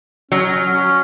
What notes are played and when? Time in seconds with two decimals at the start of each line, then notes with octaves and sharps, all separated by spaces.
0.32 F#3 C#4
0.73 C#4